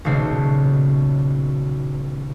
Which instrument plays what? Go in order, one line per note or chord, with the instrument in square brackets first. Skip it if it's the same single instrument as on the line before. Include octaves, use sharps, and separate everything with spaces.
[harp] D#1 B1 C#3 A3 F#4 C5